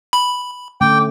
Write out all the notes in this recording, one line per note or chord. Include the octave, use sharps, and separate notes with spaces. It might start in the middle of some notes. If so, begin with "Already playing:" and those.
B5
D3 A3 C#4 G5 D6